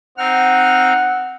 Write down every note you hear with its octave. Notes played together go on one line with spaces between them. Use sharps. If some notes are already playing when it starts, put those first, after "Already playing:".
C4 D#4 F#5 F6